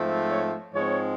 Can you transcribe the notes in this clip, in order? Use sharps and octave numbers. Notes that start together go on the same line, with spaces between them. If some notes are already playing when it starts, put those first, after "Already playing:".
Already playing: G#2 F3 A3 C4
C#5
G#2 F3 G#3 C4 C#5